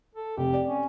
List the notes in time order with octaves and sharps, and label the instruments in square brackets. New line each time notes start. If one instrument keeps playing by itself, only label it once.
[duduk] A4
[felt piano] F1 [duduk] G4
[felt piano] D5
[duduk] C#4